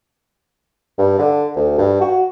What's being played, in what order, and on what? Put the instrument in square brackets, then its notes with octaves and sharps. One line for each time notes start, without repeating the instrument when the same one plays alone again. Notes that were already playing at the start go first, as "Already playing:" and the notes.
[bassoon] G2
D3
D2
G2
F#4